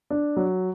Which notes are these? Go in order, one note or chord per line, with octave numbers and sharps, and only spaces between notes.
D4
F#3